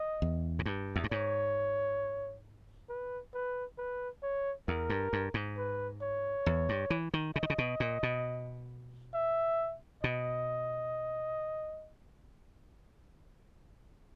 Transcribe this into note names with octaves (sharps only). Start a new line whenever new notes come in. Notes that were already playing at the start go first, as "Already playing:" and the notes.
Already playing: D#5
E2
G#2
G2
E2
G2
G#2 C#5
B4
B4
B4
C#5
E2 A#4
G2
G2
G#2
B4
C#5
E2
G2
E3
D#3
C#3 D#5
D#3
C#3
B2
A#2
B2
E5
B2 D#5